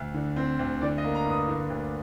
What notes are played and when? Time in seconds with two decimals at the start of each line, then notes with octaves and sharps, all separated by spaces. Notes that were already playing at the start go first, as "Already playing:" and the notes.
Already playing: D2
0.14 D3
0.36 C4
0.59 D2
0.81 D3 D5
0.98 D#5
1.04 A#3
1.15 A#5
1.25 G2
1.31 D#6
1.48 D3
1.70 D2